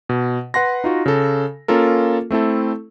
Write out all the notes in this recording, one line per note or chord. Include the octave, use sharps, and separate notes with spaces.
B2
B4 F#5 C6 A#6
D#4 F4 F#4
C#3 A4
A#3 C#4 F4 A4 A#4
A3 C4 E4 A4